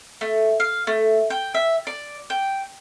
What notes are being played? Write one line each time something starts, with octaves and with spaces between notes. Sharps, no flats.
A3
F5
A3
G5
E5
D5
G5